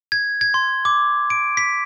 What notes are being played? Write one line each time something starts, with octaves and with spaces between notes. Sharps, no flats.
G#6
G#6
C6
D6
D7
B6